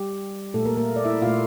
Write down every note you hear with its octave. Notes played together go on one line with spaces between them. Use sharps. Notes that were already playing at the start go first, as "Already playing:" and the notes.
Already playing: G3 G4
A#2 A3 A4
A#3 A#4
A#3 A#4
D5
E4 E5
A#2 A3 F4 F5